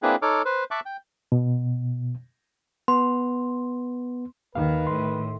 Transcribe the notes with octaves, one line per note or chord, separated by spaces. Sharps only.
A#3 C4 D4 E4 G#4 B4
D#4 A4 C#5 D6 F6
B4 C5
E5 A5 C#6 D6 F#6
G5
B2
B3 C6
D#2 D#3 B4 F5
A2 C6